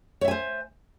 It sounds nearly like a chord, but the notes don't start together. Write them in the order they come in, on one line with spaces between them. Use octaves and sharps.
C#5 E5 G#5 C5